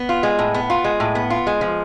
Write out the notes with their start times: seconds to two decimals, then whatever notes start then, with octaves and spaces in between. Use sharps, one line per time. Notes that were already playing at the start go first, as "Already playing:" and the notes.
Already playing: B3
0.09 F4
0.23 G#3
0.39 A2
0.54 B3
0.70 F4
0.84 G#3
1.00 A2
1.15 B3
1.30 F4
1.47 G#3
1.61 F3